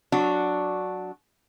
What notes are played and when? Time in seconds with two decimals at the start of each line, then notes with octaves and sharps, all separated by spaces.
0.12 F#3 D4 F#4